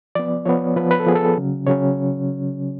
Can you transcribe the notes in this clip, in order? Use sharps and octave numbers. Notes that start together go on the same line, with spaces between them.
F3 B3 D5
F3 B3 C#5
F3 B3 B4
B4
A4
F3 B3 G#4
A4
C#3 F#3 C#4
C#3 F#3 C#4 C#5